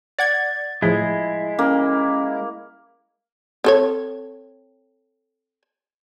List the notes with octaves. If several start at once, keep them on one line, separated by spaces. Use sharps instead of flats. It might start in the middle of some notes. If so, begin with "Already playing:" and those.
D5 F#5 G#6 A6
A2 F3 G#3 E4 G#4
A#3 C#4
C4 A4 C#5